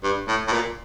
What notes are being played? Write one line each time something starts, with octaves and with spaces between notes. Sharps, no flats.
G2
A2
A2
A#2